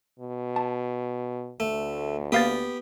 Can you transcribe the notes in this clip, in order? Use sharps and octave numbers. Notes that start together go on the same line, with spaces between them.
B2
A5
D2 A3
A#3 B3 G4 F5 A6